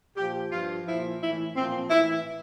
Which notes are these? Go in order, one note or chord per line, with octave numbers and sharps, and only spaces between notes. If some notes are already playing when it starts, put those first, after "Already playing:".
A#2 F3 G4
G2 F3 F4
A#2 F3 E4
A2 E3 E4
A#2 F3 C4
A2 E3 E4